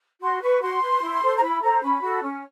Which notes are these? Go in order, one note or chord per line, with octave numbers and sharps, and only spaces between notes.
F#4 C6
B4 C#6
F#4 C6
B4
E4
A4 C5
A#5
E4 B5
A4 C5 A#5
C#4 B5
F#4 A4
C#4